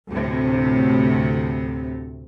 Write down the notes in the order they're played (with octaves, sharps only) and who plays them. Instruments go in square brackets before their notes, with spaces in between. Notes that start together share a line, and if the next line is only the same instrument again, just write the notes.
[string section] D2 A2 C3